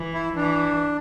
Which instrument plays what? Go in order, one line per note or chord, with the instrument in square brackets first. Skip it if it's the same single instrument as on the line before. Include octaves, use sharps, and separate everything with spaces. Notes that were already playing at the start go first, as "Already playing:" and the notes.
Already playing: [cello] E3
[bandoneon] E4
[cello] E3 [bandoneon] D4